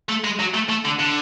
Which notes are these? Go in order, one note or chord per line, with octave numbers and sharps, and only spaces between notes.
A3
G#3
F#3
A3
A3
D3
D3